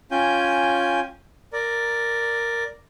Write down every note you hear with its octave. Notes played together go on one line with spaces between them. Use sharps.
C#4 F4 G5 G#5 G6
A#4 D5